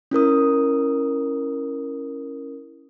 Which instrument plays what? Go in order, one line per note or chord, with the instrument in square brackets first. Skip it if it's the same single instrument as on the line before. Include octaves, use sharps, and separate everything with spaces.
[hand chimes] C#4 E4 A#4 D#6